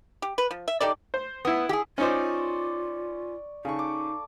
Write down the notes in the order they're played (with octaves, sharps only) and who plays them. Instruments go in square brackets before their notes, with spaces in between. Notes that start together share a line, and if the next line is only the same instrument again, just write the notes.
[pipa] G4
B4
F3
E5
D#4 G4 A4 D5
[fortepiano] C5
[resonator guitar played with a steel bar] B3 [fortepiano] E4 D#6
[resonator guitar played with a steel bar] G4 G#4
[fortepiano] C#4 D#4 C5 [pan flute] F4 [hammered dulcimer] D5 C#6
[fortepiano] C#3 [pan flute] D#4 [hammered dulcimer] A4 C#6
[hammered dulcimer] D6